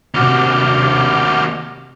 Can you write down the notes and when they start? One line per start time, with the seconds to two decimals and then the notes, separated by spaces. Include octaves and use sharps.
0.14 D#2 C3 F#4 D6 F6 G6